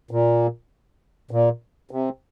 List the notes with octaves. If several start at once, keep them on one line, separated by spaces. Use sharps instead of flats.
A#2
A#2
C3